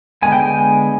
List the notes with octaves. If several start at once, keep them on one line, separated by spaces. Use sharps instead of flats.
D3 G#3 B3 G#5
G5
G#5